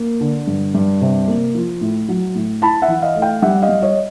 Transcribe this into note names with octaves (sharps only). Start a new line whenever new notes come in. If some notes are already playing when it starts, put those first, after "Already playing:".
Already playing: A#3
D3
G2
G2
C3
A#3
F3
A2
F#3
A2
E4 A5 B5
E5 F#5
E3
D#5 F5
A3
F5 G5
G3 E5 F#5
D#5 F5
G3
C#5 D#5